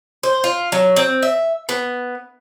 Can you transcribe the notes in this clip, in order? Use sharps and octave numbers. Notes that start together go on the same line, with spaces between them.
C5
F4
F#3
C4
E5
B3